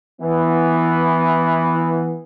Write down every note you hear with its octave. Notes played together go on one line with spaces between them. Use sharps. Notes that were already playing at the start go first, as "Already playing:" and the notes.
E3 B3